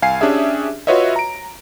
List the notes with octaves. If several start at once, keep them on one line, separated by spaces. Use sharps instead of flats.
C2 F5 G#5 C7
C#4 D4 G4 G#4 E5
F4 F#4 B4 C#5 D#5 E5
A#5 D7